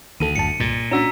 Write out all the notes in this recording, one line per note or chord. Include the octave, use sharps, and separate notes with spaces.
D2 D#3 A4 D#7
G#1 F#2 A5 C#7
C2 G2 A#2 A6
C#4 D4 F#4 A#5 E6 B6